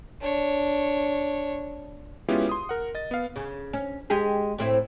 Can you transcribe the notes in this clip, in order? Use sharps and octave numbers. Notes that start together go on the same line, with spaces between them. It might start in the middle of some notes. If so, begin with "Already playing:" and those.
D4 C#5
G#3 B3 C#4 E4 F4 G4
C6 D#6
A#4 F#5
D#5 A6
B3 F5
C#3
C#4
G#3 G4 G#4
A2 C4 E4